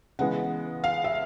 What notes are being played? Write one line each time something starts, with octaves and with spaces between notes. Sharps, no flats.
C#3 E3 G#3 B3 F#5
F5
E5